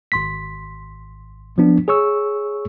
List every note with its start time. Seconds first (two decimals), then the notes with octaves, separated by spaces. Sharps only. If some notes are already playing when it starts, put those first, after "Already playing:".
0.12 G#1 C6 B6
1.58 F3 B3 D4
1.88 G#4 C#5 C#6 E6